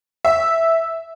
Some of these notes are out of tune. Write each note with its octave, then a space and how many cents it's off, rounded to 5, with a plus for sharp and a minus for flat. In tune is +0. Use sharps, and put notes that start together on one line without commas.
E5 -10